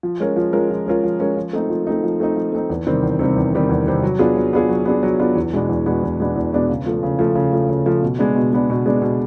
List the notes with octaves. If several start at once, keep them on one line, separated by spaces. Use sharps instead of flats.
F3
G#3 C#4 F4 A#4
F3
G#3 C#4 F4 A#4
F3
G#3 C#4 F4 A#4
F3
G#3 C#4 F4 A#4
F3
A3 C4 D#4
F3
A3 C4 D#4
F3
A3 C4 D#4
F3
A3 C4 D#4
E2
C3 D#3 G3 C4
E2
C3 D#3 G3 C4
E2
C3 D#3 G3 C4
E2
C3 D#3 G3 C4
F#3
B3 D4 F4 G#4
F#3
B3 D4 F4 G#4
F#3
B3 D4 F4 G#4
F#3
B3 D4 F4 G#4
E2
B2 G#3 B3 D4
E2
B2 G#3 B3 D4
E2
B2 G#3 B3 D4
E2
B2 G#3 B3 D4
C#3
F3 A3
C#3
F3 A3
C#3
F3 A3
C#3
F3 A3
B2
G#3 B3 D4
B2
G#3 B3 D4
B2
G#3 B3 D4
B2